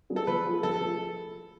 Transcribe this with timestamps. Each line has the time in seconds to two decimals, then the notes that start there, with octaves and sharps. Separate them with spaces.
0.10 F#3 B3 D4 G#4
0.16 A4
0.27 F3 B4
0.46 A3 F4 G#4
0.63 F3 A4
0.81 A3 F4 G#4